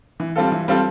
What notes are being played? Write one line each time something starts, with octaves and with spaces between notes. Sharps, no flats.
E3
G3 C4 F4 A4
E3
G3 C4 F4 A4